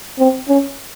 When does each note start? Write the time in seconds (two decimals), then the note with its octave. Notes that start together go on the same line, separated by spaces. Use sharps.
0.19 C4
0.49 C#4